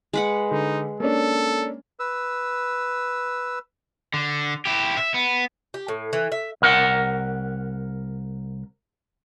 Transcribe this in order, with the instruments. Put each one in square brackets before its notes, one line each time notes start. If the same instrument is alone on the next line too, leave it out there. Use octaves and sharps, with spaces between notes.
[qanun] G#3 B4 F#5
[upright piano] D3 [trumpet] D#4
[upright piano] A#3 C#4 D4 [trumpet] A4
[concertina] B4 E6
[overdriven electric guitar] D3
E4 G4
E5
B3
[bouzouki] G4
A2
E3
E5
[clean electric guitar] C2 A#4 F#5